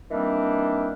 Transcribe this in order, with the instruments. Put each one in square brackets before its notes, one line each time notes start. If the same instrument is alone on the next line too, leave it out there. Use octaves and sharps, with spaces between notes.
[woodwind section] D#3 E3 G3 A#3 C4 D4